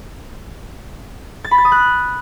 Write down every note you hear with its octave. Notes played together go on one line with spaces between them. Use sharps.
A6
B5
A6
D#6
F#6